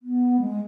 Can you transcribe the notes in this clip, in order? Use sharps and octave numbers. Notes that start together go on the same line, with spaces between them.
B3
G#3